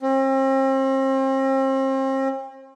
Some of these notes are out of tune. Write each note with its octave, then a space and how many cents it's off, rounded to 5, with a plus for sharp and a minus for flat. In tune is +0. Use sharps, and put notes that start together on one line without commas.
C4 +40